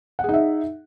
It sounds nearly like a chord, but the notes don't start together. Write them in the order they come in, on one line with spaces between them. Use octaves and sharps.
F#5 G#4 D#4 E5